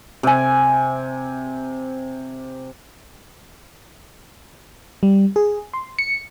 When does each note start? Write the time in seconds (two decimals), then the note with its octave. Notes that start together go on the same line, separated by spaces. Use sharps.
0.23 C3 G#5
5.03 G3
5.36 G#4
5.74 C6
5.99 C#7